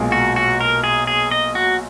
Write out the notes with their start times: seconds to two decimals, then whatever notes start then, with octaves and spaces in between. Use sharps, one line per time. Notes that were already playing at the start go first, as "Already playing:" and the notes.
Already playing: B1 A#2 G#3
0.12 F#4
0.36 F#4
0.61 A#4
0.84 G#4
1.07 G#4
1.31 D#5
1.55 F#4